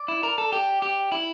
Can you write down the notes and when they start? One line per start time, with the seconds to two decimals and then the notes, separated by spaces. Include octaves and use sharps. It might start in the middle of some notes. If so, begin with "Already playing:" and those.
Already playing: D5
0.08 E4
0.23 A#4
0.38 A4
0.52 G4
0.82 G4
1.12 E4